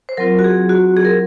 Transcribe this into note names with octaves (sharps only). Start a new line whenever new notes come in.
C5
F#3 C4 F4 A#4
F#4
G#4
F#4
G#4
A#4